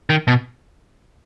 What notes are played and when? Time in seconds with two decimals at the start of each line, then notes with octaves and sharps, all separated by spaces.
0.10 D#3
0.27 B2